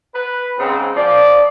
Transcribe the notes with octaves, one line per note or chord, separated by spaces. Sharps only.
B4
G#2 C#3 C4
F3 D5